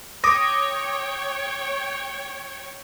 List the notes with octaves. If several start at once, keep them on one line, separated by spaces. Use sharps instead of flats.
C#5 G5 D6 D#6 A#6